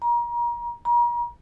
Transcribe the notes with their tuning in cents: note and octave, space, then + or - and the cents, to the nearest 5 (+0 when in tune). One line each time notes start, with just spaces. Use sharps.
A#5 +30
A#5 +40